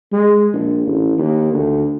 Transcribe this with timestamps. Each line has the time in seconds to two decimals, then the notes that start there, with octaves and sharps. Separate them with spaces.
0.12 G#3
0.53 A#1
0.87 A1
1.18 D#2
1.53 D2